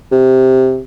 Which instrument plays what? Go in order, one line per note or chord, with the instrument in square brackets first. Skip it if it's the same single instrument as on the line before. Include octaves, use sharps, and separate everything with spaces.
[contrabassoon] C3